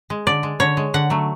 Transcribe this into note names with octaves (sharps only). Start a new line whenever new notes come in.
G#3
D3 D5
G#3
D3 C#5
G#3
D3 F#5
F#3 A3